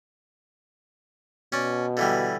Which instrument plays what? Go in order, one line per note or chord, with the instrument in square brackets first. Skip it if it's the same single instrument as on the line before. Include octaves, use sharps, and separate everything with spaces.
[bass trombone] B2 [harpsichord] C#4 D5
[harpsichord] D3 E3 G3